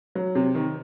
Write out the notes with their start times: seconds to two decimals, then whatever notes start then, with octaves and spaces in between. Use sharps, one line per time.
0.15 F#3
0.35 C3
0.55 D#3